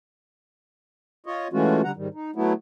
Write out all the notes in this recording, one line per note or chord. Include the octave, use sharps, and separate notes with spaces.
F4 C#5 D#5
E3 G#3 A3 C#4 F4 F#4
D3 G3 F#5 A#5
G#2 D#3 G3
D#4
F#3 A3 B3 E4